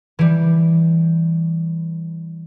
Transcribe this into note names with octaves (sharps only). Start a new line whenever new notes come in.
E3 G3